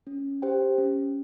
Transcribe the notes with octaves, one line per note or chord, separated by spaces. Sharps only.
C#4
G4 C5 G5
C#4